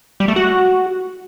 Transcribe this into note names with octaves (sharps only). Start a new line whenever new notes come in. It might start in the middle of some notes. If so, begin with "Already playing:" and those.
G3
A3
F#4